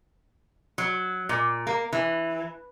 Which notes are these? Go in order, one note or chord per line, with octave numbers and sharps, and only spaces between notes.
F#3
A#2
A#3
E3